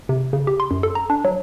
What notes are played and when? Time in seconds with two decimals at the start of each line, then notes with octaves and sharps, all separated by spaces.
0.09 C3
0.33 C#3
0.47 G4
0.60 C6
0.71 F#2
0.83 A4
0.95 A#5
1.10 D4
1.25 F#3